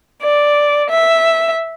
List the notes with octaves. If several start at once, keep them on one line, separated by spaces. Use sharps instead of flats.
D5
E5